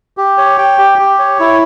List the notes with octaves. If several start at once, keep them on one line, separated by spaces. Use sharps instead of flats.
G4
C#5
G5
G4
G4
C#5
E4